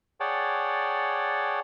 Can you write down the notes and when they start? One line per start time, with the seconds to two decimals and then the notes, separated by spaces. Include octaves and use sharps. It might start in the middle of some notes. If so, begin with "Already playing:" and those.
0.20 G#4 C#5 D5 F#5 G5 A5